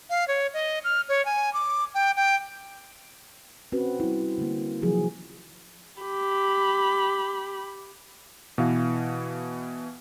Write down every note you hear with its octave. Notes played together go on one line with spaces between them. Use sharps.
F5
C#5
D#5
F6
C#5
G#5
D6
G5
G5
C4 C#4 F#4 B4
G3 E4
D3 A#3
C3 D#3 F3 F#3 G#4
G4 B5
B2 E3 F5